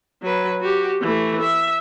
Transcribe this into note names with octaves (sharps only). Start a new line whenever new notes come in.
F#3 B4
F#4 G4
E3 A3
E5